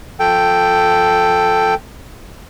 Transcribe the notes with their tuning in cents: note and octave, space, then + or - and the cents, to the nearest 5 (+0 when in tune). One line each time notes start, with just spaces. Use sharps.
F3 +0 A4 +0 G5 +0